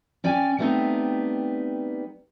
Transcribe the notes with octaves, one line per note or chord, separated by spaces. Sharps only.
C#4 D5 G5 G#5
G3 A3 B3 C4 D#4